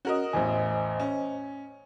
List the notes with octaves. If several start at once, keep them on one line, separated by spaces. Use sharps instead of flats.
C#4 F#4 A#4 D#5
A1 E2 C5 D#5 G#5
C#4